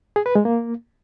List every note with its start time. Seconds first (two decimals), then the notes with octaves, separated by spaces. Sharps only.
0.16 G#4
0.26 B4
0.35 G#3
0.45 A#3